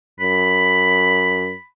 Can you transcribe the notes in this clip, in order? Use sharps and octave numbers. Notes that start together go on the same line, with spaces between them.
F#2 B5